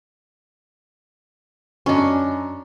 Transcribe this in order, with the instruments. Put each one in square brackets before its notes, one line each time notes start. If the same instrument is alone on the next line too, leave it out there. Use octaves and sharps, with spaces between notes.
[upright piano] F#2 D#5 [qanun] C#4 D4